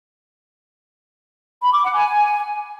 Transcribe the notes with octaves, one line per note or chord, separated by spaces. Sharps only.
B5
D6
F#5
G#5